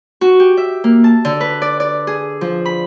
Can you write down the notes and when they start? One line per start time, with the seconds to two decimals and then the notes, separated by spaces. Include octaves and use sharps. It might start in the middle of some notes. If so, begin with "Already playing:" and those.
0.21 F#4
0.40 G4
0.57 E5
0.84 A#3
1.04 A5
1.25 D3
1.40 B4
1.62 D5
1.80 D5
2.07 G#4
2.41 F3
2.66 B5